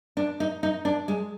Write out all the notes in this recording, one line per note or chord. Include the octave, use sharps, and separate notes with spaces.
D4
D#4
D#4
D4
G#3